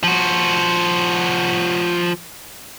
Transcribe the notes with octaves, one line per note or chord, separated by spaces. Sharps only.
F3 F#4